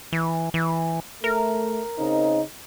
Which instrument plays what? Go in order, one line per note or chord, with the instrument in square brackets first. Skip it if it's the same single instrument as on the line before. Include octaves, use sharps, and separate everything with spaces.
[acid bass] E3
E3
[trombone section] A3 [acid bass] A#4
[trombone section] C#3 C4 D#4